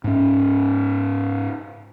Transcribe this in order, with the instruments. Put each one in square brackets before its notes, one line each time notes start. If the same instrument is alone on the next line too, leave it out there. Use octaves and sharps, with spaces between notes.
[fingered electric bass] G#2 C#4